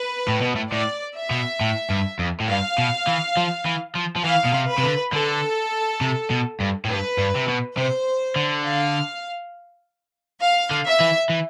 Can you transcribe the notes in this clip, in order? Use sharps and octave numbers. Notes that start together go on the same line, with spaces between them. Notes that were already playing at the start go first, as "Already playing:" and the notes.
Already playing: B4
A2
B2
A2
A2 D5
E5
B2
A2
G2
F2
A2
G2 F5
B2
E3
F3
E3
F3
F3
E3 F5
B2
C3
B4
C3
D3
D3 A4
C3
B2
G2
A2
G2 B4
G2
C3
B2
C3 C5
D3
F5
F5
D3
E5
E3
E3